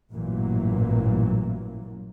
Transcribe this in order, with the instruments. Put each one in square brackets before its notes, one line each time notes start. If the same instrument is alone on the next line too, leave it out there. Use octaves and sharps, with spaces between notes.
[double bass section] A1 G2 A#2 E3 F#3 A#3